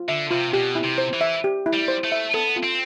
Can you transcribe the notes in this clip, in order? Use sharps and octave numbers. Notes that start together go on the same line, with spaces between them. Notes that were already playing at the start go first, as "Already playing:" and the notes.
Already playing: F4
D3 E5
C3 F4
B2 G4
E4
C3
C5
E3
E5
G4
E4
G3
C5
A3
E5
B3 A4
F4
C4